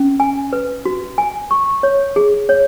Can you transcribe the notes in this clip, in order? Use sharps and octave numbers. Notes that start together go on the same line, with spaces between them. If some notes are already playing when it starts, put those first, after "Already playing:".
Already playing: C#4
G#5
B4
F#4
G#5
C#6
C#5
G#4
C#5